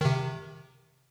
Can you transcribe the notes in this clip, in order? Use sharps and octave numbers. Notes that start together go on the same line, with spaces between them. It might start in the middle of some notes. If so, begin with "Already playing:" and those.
C3 D#3